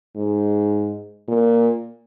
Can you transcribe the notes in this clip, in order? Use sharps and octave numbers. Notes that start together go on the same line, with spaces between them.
G#2
A#2